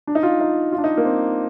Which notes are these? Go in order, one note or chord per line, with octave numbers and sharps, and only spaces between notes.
D4
D#4
F4
D#4
F4
D4
D#4
A#3
C4